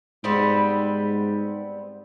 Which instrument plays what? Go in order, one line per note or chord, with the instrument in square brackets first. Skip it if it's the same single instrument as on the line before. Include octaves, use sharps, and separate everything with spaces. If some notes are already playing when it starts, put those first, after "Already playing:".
[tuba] G#2 [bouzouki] G3 B3 C4